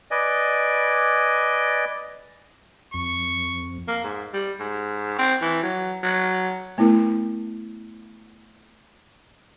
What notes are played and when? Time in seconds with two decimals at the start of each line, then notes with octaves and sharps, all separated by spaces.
0.11 B4 D5 D#5 G#5
2.94 F2 C#6
3.88 A#3
4.04 G#2
4.34 G3
4.60 G#2
5.18 C4
5.41 E3
5.63 F#3
6.03 F#3
6.78 A3 B3 E4 A#4